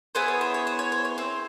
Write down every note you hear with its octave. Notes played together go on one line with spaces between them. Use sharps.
B3 E4 G#4 C5
C#5
C5
C#5
C5
C#5
C5
C#5
C4 C5